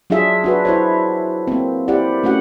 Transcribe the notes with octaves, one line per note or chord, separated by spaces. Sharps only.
F#3 D4 F4 G#4 E5
D4 F#4 B4
E4 C5 C#5
A#3 C4
E4 G4 D5 F#5
A3 C#4 F#4 F#5